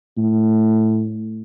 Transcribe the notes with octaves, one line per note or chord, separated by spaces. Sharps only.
A2